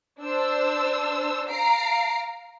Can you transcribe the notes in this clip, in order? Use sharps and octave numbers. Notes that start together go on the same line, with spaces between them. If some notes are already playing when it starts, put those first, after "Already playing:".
D4 C5 E6
F5 A#5 C7 D7